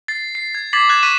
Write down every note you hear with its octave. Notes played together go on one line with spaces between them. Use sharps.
A6 C7
C7
G#6
D6 G#6 A6 B6 C7 F#7
F#6 G#6 A6 E7
C#6 F#6 B6 D#7 E7